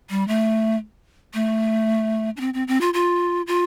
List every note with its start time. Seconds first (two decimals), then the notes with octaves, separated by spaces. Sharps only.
0.10 G3
0.28 A3
1.34 A3
2.37 D4
2.40 C4
2.54 C4
2.68 C4
2.81 F4
2.94 F4
3.47 F4